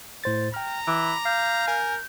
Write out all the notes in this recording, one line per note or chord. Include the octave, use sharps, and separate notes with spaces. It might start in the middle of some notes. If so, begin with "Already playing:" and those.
A2 C5 A6
G5 A#5 F6
E3 B5 D6
F5 G6
A#4 G#5